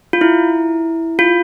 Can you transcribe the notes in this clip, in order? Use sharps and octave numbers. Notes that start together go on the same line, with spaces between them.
F4
E4
F4